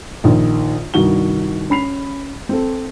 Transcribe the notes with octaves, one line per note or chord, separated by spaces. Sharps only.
A#1 D#3
C2 G2 D#3 F#4 G7
C#4 B5 C7 F7
C4 A4